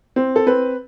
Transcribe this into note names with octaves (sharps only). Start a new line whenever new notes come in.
C4
A4
C4 B4